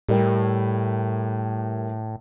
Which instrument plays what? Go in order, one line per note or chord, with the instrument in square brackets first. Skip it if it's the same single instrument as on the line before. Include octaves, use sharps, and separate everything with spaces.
[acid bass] A2 [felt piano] G3 A#4 G5